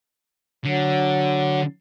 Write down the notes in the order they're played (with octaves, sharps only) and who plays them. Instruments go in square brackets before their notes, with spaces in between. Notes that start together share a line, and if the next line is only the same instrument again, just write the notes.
[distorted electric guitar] D3 [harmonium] F#3